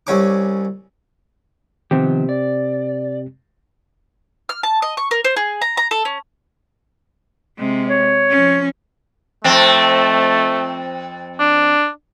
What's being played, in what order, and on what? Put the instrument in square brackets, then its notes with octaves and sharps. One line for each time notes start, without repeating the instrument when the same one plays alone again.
[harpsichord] C2 C#4 D6
[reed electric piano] C3 C4 G4 [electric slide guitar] D#3 F3 B3
[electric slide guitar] D5
[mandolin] F6
A5
D#5
C#6
A#4
C5
G#4
A#5
A#5
A4
C#4
[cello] C3 G#3
[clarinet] C#5
[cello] F3 C#4
[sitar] F2 C4 [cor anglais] A3
[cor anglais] D4